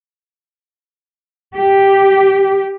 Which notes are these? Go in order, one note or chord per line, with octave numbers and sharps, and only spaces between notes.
G4